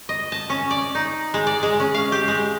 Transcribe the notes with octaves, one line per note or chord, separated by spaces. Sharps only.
D#5
A5
C#4
D5
D#4
G#3
D5
G#3
C#4
F5
G4
G#3